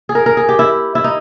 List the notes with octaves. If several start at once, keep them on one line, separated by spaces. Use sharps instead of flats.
G#4
A#4
A#4
G#4
G4
E4
E4
D#4